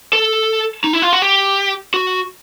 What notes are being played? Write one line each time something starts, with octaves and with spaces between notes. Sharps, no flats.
A4
D#4
E4
F4
F#4
G4
F#4